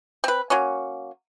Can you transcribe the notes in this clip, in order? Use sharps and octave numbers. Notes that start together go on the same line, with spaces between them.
C4 B4
F#3 A#3 C#4